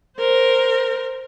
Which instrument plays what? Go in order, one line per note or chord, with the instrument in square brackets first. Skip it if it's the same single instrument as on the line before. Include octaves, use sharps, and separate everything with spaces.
[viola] A#4 C5